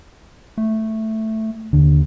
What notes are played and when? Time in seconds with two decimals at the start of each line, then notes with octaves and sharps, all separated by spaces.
0.58 A3
1.73 D#2 D3